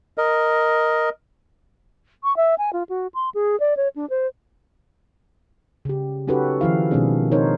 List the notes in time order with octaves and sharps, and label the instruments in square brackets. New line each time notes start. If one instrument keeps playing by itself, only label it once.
[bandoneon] A#4 D#5
[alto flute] C#6
E5
G#5
F4
F#4
C6
G#4
D5
C#5
D4
C5
[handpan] C#3 G4
C#4 D#4 F#4 G4 A4 B4
D#3 F3 E4 F5
B2 D#3 G#3 C4 D4 G#4
C4 D#4 A#4 C5 C#5